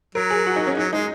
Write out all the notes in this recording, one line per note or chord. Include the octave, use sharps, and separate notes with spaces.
F#3 A#4
G#4
F#4
D#4
C#4
F#3 D#4
G#3 D#4